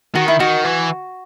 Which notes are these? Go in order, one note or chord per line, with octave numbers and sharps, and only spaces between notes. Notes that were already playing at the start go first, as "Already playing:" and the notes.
D#3 F#4
E4
D#3 F#4
E3